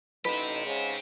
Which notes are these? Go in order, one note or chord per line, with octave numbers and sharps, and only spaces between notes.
A1 D#4 G4 B4 C5
G#2 C#3